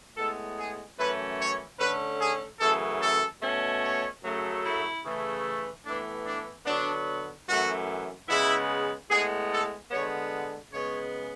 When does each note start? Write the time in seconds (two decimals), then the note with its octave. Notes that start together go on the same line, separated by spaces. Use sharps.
0.17 A2 G#3 B3 A4
0.58 G#4
0.98 F#2 E3 A3 C#4 B4
1.39 C#5
1.79 D3 A3 C#4 B4
2.21 G#4
2.60 F#2 C#3 E3 A3 A4
3.01 A4
3.42 B2 A3 C#4
3.82 C#5
4.23 F#2 C#3 F#3 A3
4.64 E4
5.04 C#3 E3 A3
5.85 A2 E3 B3 D4
6.26 D4
6.66 D3 F#3 B3 D4
7.47 F#2 E3 A3 F#4
8.29 C#3 G#3 B3 E4
9.10 A2 G#3 B3 G#4
9.51 A4
9.91 D3 G#3 B3 C#5
10.72 C#3 G#3 B3 C#5